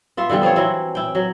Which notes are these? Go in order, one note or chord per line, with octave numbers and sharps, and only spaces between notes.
B3 F4 E5
D3 E3 G3 B3
F3 C4 F4 C#5
E3 F#3 E4
E4 G5
F#3